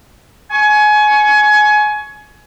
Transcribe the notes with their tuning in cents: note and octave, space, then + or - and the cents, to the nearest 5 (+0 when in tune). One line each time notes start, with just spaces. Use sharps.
G#5 +25 C#6 +0